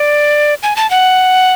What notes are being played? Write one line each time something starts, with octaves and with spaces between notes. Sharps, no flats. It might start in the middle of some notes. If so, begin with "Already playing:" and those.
Already playing: D5
G#5
A5
F#5